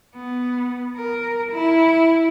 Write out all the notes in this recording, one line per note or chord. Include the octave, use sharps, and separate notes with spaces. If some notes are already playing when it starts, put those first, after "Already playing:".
B3
A#4
E4